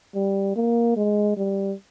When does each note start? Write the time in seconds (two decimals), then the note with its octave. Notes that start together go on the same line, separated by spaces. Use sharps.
0.15 G3
0.56 A#3
0.96 G#3
1.37 G3